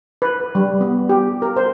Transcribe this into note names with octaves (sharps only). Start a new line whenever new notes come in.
B4
G3
B3
G4
A#4
C5